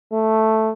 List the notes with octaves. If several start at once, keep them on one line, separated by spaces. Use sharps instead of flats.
A3